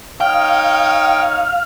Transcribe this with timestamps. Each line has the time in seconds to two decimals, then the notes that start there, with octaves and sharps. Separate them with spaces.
0.21 D#4 C#5 F5 G5 D#6